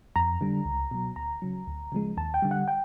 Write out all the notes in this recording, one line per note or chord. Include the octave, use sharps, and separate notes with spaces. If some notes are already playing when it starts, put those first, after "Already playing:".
F2 A#5
D3 G3
C#2
B2 F#3
D2 A#5
C#3 F#3
D2
C#3 F3 G#3
D#2 A5
G5
D3 G3
F#5
G5